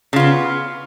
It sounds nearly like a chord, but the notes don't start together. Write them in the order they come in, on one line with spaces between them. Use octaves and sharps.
C#3 F4 B3